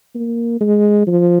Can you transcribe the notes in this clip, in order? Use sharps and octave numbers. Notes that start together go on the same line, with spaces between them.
A#3
G#3
F3